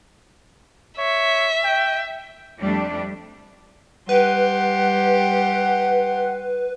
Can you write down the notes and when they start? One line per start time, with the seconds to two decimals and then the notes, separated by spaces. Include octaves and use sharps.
0.98 C#5 E5
1.64 G5
2.60 F2 G3 A3 D4
4.09 G3 G4 B4 F#5 C6